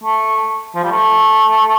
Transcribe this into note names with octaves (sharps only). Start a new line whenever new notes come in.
A3
F3
G3
A3